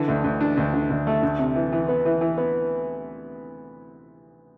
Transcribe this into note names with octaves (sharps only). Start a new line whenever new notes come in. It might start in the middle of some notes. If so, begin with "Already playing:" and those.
Already playing: D3 E3
D2
D2
D4
D2
D3
D2
A3
D2
C3
E3
E3
B3
E3
E3
B3